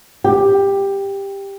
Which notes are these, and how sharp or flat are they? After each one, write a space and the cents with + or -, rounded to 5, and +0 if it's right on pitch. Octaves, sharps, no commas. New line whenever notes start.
G4 +10